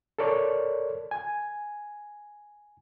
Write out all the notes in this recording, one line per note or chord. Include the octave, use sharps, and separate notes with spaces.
A4 A#4 C#5 D5
G#5